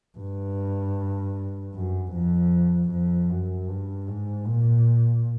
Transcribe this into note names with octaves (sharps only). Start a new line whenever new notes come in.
G2
F#2
F2
F2
F#2
G2
G#2
A#2